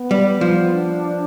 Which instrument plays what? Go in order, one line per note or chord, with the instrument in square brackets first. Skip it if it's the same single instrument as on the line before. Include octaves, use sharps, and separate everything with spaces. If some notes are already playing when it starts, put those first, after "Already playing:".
Already playing: [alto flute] B3
[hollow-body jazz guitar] G3
F3
[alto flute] D4